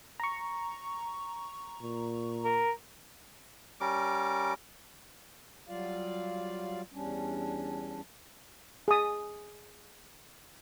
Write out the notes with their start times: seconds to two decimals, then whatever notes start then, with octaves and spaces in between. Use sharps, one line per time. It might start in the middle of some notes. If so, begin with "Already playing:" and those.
0.20 A#5 C#6
1.82 A#2
2.45 A#4
3.81 G3 C#4 A#4 D6
5.68 F#3 G3 F4 D5 F5
6.93 E2 G3 C#4 D4
8.88 G#4 D#6